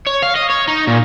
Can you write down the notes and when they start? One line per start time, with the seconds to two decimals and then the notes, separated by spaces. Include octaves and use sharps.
0.06 C#5
0.22 F5
0.36 D#5
0.50 C#5
0.68 D#4
0.87 A#2